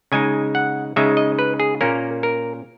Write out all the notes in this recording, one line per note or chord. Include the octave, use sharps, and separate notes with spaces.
C#3 G#3 D#4 G#5
F#5
C#3 G#3 D#4 E5
D#5
B4
G#4
A#2 A#3 C#4 A#4
A#4